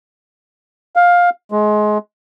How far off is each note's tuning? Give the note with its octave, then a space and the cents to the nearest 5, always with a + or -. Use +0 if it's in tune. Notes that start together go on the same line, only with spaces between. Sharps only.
F5 +15
G#3 +25